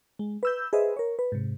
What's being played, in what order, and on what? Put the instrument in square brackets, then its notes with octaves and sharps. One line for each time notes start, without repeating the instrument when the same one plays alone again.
[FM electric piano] G#3
B4 E6 G6
G#4 B4 C5 D#5 E5
A#4 C#5
B4
G#2 C3